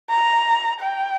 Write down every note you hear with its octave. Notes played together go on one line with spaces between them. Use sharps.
A#5
G5